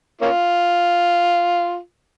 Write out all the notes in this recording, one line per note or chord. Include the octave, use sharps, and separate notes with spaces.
A#3 C#4 F4